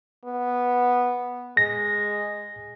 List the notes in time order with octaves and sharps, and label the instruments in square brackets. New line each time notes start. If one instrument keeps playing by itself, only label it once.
[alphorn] B3
[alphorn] G#3 [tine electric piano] A#6